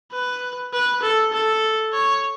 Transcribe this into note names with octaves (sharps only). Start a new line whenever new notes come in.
B4
B4
A4
A4
C#5